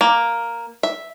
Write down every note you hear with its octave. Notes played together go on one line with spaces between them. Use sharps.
A#3
E5